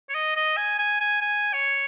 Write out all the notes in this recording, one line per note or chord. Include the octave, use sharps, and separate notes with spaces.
C#5
D#5
D#5
G#5
G#5
G#5
G#5
C#5